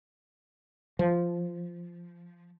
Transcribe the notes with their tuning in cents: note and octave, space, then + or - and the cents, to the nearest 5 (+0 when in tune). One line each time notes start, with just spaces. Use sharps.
F3 -10